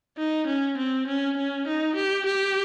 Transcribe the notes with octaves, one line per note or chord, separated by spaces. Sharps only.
D#4
C#4
C4
C#4
C#4
D#4
G4
G4